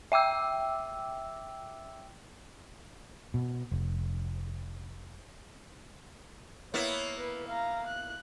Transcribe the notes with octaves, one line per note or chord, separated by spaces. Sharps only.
E5 G5 D6 E6
B2
F1
A#3 B3 E4 C#5
B4
F5 A#5
F#6